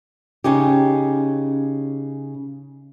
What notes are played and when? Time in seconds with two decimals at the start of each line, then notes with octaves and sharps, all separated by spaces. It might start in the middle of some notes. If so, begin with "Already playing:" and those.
0.44 C#3 C#4 D#4 G4